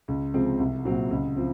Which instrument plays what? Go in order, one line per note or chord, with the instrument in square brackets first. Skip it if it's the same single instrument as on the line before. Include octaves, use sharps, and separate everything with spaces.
[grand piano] C#2
C3 F3 G#3 C4
C2
A#2 F#3 C4
C#2
F3 C4